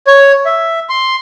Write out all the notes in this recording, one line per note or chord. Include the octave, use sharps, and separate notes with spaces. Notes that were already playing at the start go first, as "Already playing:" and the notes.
C#5
E5
C6